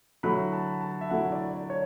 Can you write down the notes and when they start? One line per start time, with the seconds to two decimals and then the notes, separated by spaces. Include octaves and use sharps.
0.23 D3 F#3 A3 E4 B5
0.53 A5
0.81 A5
1.01 E5
1.10 D3 F#3 A3 E4 F#5
1.32 D5
1.53 D5
1.70 C#5